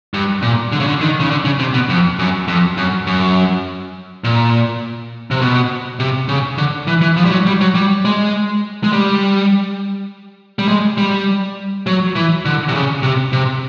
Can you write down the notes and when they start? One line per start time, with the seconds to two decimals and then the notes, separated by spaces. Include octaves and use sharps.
0.14 G2
0.42 A#2
0.72 D3
0.80 C#3
0.87 D3
1.01 D#3
1.20 C#3
1.30 D3
1.45 C#3
1.59 C3
1.74 B2
1.89 F2
2.19 F#2
2.48 F2
2.77 F#2
3.07 F#2
4.24 A#2
5.31 C3
5.41 B2
6.00 C3
6.28 C#3
6.58 D3
6.87 E3
7.02 E3
7.17 F3
7.25 G3
7.31 F#3
7.47 G3
7.61 F#3
7.75 G3
8.05 G#3
8.84 G#3
8.93 G3
10.59 G3
10.68 G#3
10.98 G3
11.87 F#3
12.15 E3
12.45 D3
12.68 C3
12.75 C#3
13.03 C3
13.33 C3